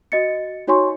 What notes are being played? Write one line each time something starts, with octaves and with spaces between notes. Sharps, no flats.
F#4 D#5 A6 C#7
D#4 F#4 C#5 G#5 C6 C#6